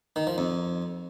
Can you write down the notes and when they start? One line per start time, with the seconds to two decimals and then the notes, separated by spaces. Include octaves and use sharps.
0.16 D#3
0.27 F3
0.38 F2